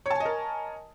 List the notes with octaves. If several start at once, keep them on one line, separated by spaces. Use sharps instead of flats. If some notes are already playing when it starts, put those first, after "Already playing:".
A#4 C#5 D#5 G#5 A5